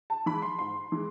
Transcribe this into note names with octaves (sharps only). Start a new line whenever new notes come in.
A5
E3 G#3 B5
C6
G#2 C6
E3 G#3